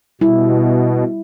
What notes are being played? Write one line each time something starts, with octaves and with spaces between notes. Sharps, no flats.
B2 G3 E4